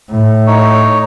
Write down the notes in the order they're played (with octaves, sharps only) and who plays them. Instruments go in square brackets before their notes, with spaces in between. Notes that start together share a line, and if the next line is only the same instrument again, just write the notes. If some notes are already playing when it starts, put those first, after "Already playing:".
[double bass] A2
[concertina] D#4 C#5